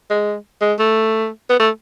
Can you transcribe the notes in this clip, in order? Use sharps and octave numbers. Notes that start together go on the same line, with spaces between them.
G#3
G#3
A3
B3
A3